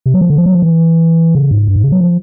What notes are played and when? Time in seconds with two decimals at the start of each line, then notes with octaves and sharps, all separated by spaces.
0.06 C3
0.14 F#3
0.21 F3
0.30 D3
0.38 F3
0.46 F#3
0.54 F3
0.62 E3
1.35 C#3
1.51 G#2
1.67 G2
1.76 G#2
1.84 C#3
1.92 F#3
2.00 F3